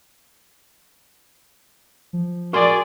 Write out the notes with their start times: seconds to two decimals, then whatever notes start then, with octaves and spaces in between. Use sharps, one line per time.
2.13 F3
2.53 F#4 G#4 A#4 D5 C6